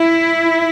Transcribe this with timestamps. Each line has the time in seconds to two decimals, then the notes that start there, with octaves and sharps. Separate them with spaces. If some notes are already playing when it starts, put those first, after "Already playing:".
Already playing: E4